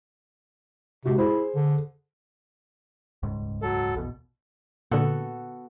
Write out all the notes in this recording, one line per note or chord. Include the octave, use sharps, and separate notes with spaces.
C3 G#3 F#4
E4 G#4 C5
D3
D#1 C#2 G#2
F#3 A4
A#1 E2 B2
A#2 D3 B3 F#4 A4